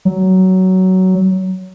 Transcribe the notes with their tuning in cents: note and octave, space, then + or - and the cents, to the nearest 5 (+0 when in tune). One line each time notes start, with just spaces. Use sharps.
F#3 +15